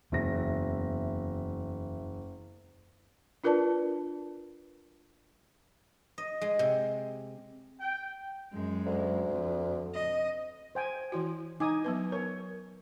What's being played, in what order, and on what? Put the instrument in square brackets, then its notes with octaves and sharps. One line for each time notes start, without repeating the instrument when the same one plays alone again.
[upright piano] F#1 E5 A#6 [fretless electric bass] E2 B2
[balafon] D4 F4 A#4 B4 D5 A5
[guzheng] D#5
G#3
C3
[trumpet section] G5
[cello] F#2 G#3
[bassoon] D2
[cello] F2
D#5
[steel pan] C5 G5 G#5
[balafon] E3 E4 F#4
[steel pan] D#4 G#5 D#6 [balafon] D6
[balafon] F#3 B3 B4
[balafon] A#4 [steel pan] C#5